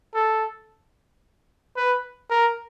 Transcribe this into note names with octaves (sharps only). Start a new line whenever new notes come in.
A4
B4
A#4